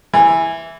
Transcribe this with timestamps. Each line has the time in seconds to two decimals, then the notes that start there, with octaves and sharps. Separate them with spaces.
0.13 E3